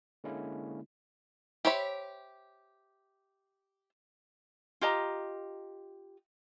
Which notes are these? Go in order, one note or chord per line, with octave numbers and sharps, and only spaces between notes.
D3 G#3 A#3 C#4 E4
G4 C5 C#5 E5 B5
F4 G4 D#5 A#5